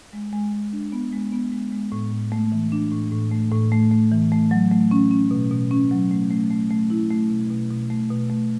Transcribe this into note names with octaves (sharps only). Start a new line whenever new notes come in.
G#3
G#3
G#3
D4
B3
G#3
B3
G#3
G#3
A2
A2
A3
E3
D4
A2
A2
A3
A2
A3
A3
E3
A3
F#3
A3
C#4
C#4
B2
B2
C#4
F#3
A3
A3
A3
A3
E4
A3
B2
B2
B2
A3
B2
A3